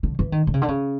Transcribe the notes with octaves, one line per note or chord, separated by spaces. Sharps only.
D3
E3
D#3
D3
C#3
D3
C#3